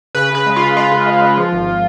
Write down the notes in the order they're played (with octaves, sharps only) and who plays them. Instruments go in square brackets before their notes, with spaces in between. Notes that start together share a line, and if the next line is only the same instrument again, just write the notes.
[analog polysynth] C#3 B4
C#3 B4
G#3
C#3 F4
G#3 F4
C#3
G#3
G#3
F3
G#1